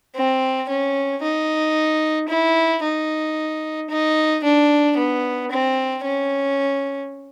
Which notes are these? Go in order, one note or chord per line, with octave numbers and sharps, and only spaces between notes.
C4
C#4
D#4
E4
D#4
D#4
D4
B3
C4
C#4